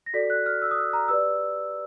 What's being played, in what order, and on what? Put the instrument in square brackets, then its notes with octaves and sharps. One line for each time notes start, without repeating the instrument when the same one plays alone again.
[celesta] A#6
F#4 A4 D5 B6
F#6
F6
E6
D#6
E6
A#5
G4 B4 D5 E6